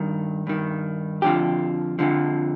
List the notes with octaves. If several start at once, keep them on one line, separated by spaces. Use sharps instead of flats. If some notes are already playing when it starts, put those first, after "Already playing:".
Already playing: G2 D#3
G2 D#3
F2 D3 F3 G4
F2 D3 F3